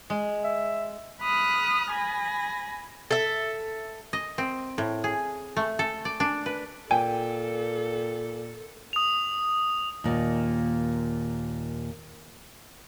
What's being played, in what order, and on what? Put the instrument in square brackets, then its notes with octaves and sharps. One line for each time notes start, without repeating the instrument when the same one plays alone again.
[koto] G#3
[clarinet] E5
[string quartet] B5 D#6 F6 F#6
G#5 B5 A#6
[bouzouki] A4 E5
[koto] D#5
C4
A2
G#4
A3
A4
D5
D4
B4
[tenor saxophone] A#2 [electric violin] A4 [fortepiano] G5 [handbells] G#5
[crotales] D#6 F7
[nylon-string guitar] D#2 A#2